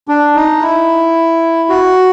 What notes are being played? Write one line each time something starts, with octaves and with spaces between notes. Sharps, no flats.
D4
D#4
E4
F#4